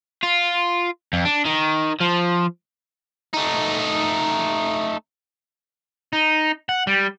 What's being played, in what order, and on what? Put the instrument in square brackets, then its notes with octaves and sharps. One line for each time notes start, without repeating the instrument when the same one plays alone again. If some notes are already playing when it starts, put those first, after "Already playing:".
[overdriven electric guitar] F4
F2
D4
D#3
F3
A3 D#4
[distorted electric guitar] D#4
F#5
G3